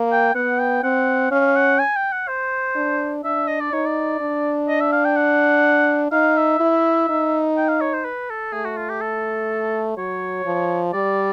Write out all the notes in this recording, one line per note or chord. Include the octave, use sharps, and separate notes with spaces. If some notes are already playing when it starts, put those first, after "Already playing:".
Already playing: A#3
G5
B3 F#5
G5
C4 F#5
C#4 F5
F#5
G#5
G5
F#5
C5
D4
D4 E5
D#5
D5
D#4 C#5
D5
D4
D#5
E5
F5
G5
F#5
D#4 F5
E5
E4
D#4
G5
F5
C#5
C5
B4
A4
A3 G#4
F#4
F4
G4
A4
F#3 C#5
F3
G3 D5